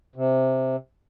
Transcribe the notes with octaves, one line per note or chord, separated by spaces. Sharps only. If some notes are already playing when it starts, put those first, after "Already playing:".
C3